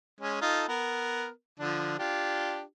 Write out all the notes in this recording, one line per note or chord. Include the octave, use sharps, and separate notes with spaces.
G#3 C#4
D#4 F4 A4
B3 A#4
D3 F3 D4
D4 F4 G4